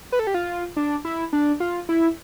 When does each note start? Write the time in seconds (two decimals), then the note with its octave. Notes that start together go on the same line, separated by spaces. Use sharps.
0.12 B4
0.19 A4
0.27 G4
0.34 F4
0.76 D4
1.05 E4
1.33 D4
1.60 F4
1.89 E4